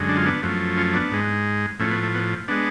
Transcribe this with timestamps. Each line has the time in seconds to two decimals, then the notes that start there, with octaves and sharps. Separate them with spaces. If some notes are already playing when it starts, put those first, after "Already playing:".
Already playing: F#2 D3 G#3
0.09 D4
0.17 F4
0.26 B3 D4
0.43 F#2 F3 A3
0.77 C#4 F4
0.94 B3 D4
1.12 G#2 G#3
1.79 A2 F3 A3 C#4
1.91 B3
2.03 A3
2.15 B3
2.48 G#3 B3 D4